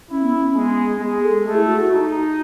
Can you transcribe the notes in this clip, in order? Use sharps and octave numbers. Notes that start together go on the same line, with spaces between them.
C#4 E4
B3
C#4
G#3 B3
G#3 G#4
A4
A3 G#4
E4
F#4
D#4